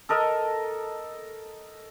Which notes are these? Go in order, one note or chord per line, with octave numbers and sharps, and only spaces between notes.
A4 A#4 D#5